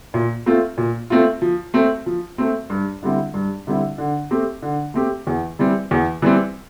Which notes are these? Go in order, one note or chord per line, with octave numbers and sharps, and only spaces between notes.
A#2
A3 C4 F4
A#2
A3 C4 F4
F3
A3 C4
F3
A3 C4
G2
D3 G3 C4 E4
G2
D3 G3 C4 E4
D3
A3 C4 G4
D3
A3 C4 G4
E2
E3 G3 C4
E2
E3 G3 C4